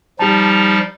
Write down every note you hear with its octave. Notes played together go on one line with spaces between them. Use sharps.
F3 G3 D#4 G4 A5